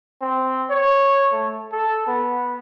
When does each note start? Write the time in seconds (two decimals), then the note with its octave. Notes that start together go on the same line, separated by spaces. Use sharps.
0.21 C4
0.70 C#5
1.33 A3
1.73 A4
2.07 B3